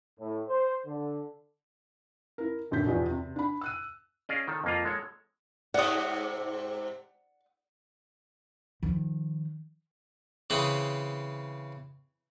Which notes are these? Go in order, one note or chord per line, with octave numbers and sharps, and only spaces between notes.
A2
C5
D3
E4 A#4
D#1 F#2 D3 G6 B6
B1 E2 F3 G4 D#5 G#5
C3
D4 B5
E6 F#6 D#7
C#4 G#4 D5 D#5 F5
D#3 A4
F2 A#3 F4
G#3 A4 C#5
G#2 C3 D5 F#5 D#6
D#3 F3
C#3 E3 C4 B5 D#6